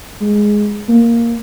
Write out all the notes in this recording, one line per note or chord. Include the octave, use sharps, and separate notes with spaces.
G#3
A#3